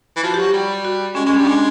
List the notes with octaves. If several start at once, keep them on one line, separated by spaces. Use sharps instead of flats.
E3
F3 F#4
G4
F#3
G4
G3
F#4
G#3 C#4
G#3 C#4
G3 D4
G#3 D4